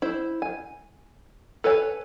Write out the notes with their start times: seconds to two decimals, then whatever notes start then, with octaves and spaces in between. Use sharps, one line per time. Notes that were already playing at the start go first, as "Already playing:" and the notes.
0.02 E4 C5
0.42 G#5
1.64 A4 B4 C#5 G#5